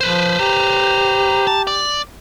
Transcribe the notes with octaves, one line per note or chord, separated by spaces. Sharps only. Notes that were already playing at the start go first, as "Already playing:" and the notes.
F3 B4 C5
G4 A#5
A5
D5